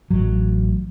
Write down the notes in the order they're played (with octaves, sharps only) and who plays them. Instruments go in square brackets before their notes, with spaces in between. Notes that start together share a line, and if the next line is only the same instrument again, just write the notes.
[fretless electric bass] A1 F#3